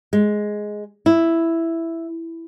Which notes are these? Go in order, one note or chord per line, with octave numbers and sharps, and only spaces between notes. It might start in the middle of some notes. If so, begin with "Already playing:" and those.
G#3
E4